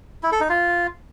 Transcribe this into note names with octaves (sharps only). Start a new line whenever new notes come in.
E4
A4
D#4
F4